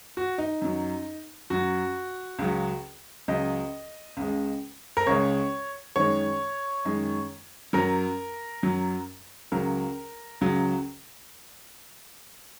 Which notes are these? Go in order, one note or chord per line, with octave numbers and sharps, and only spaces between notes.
F#4
D#4
F#2 F#3
F#2 F#3 F#4
C#2 C#3 F#3
C#2 C#3 F#3 D#5
C#2 C#3 G#3
A#4
C#2 C#3 G#3 C#5
F#2 D#3 G#3 C#5
F#2 D#3 G#3
F#2 F#3 A#4
F#2 F#3
C#2 C#3 F#3 A#4
C#2 C#3 F#3